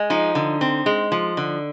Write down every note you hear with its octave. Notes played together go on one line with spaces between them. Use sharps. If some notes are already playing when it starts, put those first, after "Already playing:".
Already playing: G#3
F3 D#4
D3
C4
G#3
F3
D3